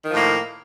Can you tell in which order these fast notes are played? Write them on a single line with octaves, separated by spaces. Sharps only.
D#3 F3 A2 A#3